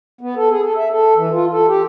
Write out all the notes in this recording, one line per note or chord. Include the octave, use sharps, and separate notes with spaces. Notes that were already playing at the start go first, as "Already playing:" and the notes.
B3
A4
G#4
A4
E5
A4
E3
F4
A4
G4